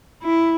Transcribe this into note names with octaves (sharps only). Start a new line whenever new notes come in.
E4